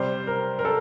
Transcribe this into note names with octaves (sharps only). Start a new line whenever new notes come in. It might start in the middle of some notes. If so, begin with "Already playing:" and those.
Already playing: C3 G3 C5
A#4
A#4
A4